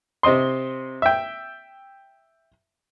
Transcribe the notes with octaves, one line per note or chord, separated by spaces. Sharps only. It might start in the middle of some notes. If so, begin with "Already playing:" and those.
C3 C4 D#5 C6
E5 G5